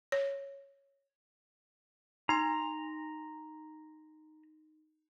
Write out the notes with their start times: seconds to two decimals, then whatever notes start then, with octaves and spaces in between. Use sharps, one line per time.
0.12 C#5
2.29 D#4 A#5 C6